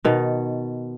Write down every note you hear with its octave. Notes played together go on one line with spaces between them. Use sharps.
B2 D#3